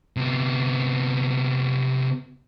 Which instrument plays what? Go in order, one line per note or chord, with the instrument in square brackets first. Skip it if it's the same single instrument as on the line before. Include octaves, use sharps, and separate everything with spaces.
[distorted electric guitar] C3 B3